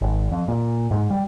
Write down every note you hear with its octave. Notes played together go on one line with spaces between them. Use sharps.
G#1
F2
A#2
G#2
G3